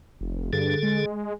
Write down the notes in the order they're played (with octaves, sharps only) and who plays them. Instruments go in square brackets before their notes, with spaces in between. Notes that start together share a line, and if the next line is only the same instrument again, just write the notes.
[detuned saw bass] F1
[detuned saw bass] G2 [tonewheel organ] D3 G#4 A4
[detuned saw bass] G#3